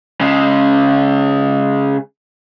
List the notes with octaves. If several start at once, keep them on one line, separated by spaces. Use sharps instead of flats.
C#3 G#3